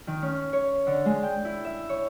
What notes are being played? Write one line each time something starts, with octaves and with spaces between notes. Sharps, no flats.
D#3
C#4
C#5
D3
G#3
G5
E4
E5
C#5